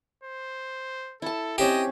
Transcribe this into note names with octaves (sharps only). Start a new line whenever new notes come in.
C5
E4 A4 A5
C4 C#4 G4 C5 D#5